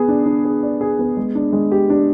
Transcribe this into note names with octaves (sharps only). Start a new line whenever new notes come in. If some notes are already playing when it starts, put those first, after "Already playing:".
Already playing: B3 G#4
D4
D4
G#4
D5
G#4
B3
G#3
D4
G#3
G4
D4